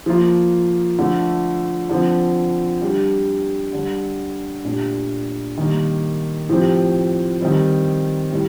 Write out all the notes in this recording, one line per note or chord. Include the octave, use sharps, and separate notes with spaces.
F3 A#3 F4
D3 F3 A3
D3 F3 C4
G3 D4 G4
D3 G3 D4
A#2 A3 D4 G4
D#3 G3 A#3
A2 F3 C4 G4
D#3 G3 C4
A2 G3